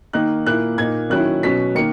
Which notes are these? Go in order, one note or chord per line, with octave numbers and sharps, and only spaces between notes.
D#3 A#3 D#4 F#6
A#2 A#3 E4 F#6
A#2 A#3 D#4 G#6
D#3 F#3 C#4 E4 F#6
B2 F#3 C#4 B6
D#3 A#3 C#7